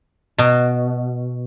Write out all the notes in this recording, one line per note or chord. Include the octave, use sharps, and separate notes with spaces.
B2